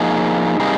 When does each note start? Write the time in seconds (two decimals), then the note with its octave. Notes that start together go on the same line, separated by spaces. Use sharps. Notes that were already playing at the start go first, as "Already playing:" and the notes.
Already playing: F3 A#3 D#4 G#4
0.59 C3 G3 A#3 D#4 G#4